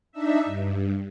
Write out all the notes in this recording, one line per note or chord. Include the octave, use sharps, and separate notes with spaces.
D4 D#4 E5
G2